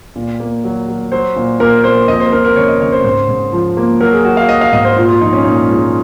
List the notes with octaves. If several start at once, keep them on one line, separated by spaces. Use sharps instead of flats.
A#2
A#3
F#3
F#3
F#3 C5
A#2
A#2 A#4
A#3 C5
F2 D#5
C5
F2 A#4
A#4
C#3 C#5
D#5
C#3 C#5
C5
G#2 C5
G#2
F3
A#3
F#3 A#4
G#4
F#3 F#4
F5
F#3 D#5
F5
G#2 D#5
C5
A#2 F4
F4
F3 D#4
C#4
A#2 D#4
G#3 F4